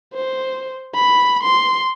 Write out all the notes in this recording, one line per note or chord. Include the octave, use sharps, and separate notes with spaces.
C5
B5
C6